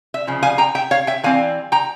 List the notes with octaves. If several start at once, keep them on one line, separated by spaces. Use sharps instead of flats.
E5
C#3 F3
F5 G#5
G5 A#5
E5 G5
C#5 F5
E5 G5
E3 G3 C4 F5 G#5
G5 A#5